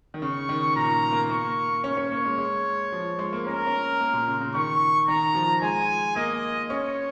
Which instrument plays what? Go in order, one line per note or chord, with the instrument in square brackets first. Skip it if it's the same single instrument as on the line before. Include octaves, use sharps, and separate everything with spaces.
[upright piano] D#3
[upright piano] C#3 [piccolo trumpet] C#6
[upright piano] D#3
[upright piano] A#2 [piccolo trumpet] A#5
[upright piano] A#3
[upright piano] A#3 [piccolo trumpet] C#6
[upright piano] C#4 [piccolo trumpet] C#5
[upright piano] C#4
A#3
G#3
G#3
F3
G#3
A#3
[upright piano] C#4 [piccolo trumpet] A#4
[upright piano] C#4
A#3
A#2
C#3
C#3
[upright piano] D#3 [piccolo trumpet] C#6
[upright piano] D#3 [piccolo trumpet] A#5
[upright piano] F3
[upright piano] G#3 [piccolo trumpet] G#5
[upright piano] A#3 [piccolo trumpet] D#5
[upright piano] C#4 [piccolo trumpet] C#5